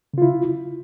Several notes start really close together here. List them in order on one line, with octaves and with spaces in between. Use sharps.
C#3 F4 E4